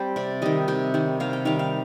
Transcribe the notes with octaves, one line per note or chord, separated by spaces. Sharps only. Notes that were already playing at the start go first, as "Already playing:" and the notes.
Already playing: G3 C4 C5
C3 D5
D#3 G3 D#5
C3 G5
D#3 G3
C3 F5
G5
D#3 G3 F5
F5